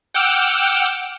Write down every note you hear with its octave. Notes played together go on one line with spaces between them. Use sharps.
F#5 G5 D6 E6 F6